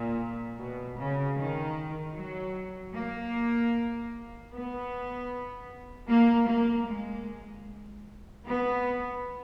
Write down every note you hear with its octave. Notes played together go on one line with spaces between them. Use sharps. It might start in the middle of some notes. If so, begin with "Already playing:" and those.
Already playing: A#2
B2
C#3
D#3
F#3
A#3
B3
A#3
A#3
G#3
B3